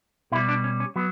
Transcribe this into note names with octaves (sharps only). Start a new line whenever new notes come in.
B2 G3 E4
D4
C#4
C#4
F#3 B3